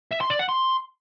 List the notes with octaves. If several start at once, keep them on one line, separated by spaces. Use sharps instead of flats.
E5
C6
D5
F#5
C6